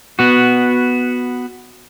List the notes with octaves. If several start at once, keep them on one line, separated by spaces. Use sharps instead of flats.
B3 F#4